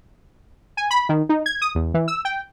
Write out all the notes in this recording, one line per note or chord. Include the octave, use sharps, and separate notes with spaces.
G#5
B5
D#3
D#4
G#6
D#6
E2
E3
E6
G5